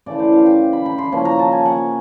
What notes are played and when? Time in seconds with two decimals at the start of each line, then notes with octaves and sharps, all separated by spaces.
0.06 C#3 E3 A3 D5
0.19 C5
0.32 F5
0.46 G5
0.73 B5
0.86 B5
0.98 C6
1.12 C#3 F3 A#3 C#4
1.25 A#5
1.39 A5
1.52 G#5
1.66 F#5